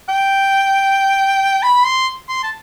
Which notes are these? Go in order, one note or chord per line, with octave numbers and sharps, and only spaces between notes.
G5
B5
C6
C6
A5